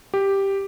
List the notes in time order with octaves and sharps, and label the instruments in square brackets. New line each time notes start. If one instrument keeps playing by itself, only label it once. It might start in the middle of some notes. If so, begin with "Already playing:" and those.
[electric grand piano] G4